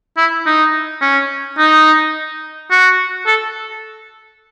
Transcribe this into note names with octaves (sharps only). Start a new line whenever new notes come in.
E4
D#4
C#4
D#4
F#4
A4